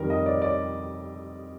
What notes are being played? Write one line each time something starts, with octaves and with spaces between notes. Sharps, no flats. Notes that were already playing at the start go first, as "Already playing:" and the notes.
Already playing: F2 D#3 G3 A#4
D#5
D5
D5